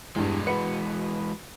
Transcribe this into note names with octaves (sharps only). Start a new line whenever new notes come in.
E2 G2 E3 G#3
F#4 B4 C#7